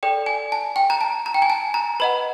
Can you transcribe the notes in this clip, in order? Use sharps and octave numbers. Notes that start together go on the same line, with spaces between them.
A4 D5 G5
G#5
A5
G5
A#5
A5
A#5
G5
G#5
A5
A#5
B4 D#5 F#5 B5